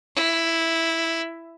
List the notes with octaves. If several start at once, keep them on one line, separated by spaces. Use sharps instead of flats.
E4